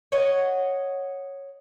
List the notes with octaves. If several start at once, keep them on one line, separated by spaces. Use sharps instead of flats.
C#5 D#5 F#5